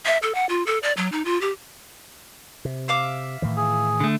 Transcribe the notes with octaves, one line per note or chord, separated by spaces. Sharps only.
E5
A4
F#5
F4
A4
D5
F#3
D#4
F4
G4
C3
E5 F5 D6
A2 D#3 E3
G#4
D3 A3